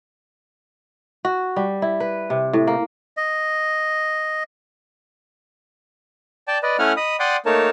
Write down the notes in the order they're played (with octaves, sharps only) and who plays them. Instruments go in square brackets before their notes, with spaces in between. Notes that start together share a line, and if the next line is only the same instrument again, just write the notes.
[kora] F#4
G3
E4
B4
C3
A2
A#3
[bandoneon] D#5
[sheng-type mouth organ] D5 G5 A5
B4 D5 D#5
A3 C#4 E4 F#5 G#5 F6
D#5 B5 D#6
D5 F#5 G5 C6 D6 D#6
A3 A#3 D#4 A#4 C#5 A5